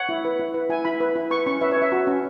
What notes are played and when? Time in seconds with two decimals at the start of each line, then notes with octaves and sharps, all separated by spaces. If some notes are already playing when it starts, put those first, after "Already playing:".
Already playing: C#5 F#5
0.09 E4
0.25 B4
0.40 E4
0.54 B4
0.70 E4 G#5
0.85 E4 B5
1.00 B4
1.15 E4
1.31 B4 C#6
1.46 C#4 C#6
1.61 B4 E5
1.71 C#5
1.77 B4
1.82 E5
1.92 F#4
2.07 C#4